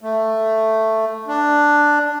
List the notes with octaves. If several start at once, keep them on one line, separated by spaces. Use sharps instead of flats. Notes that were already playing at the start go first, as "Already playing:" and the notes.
A3
D4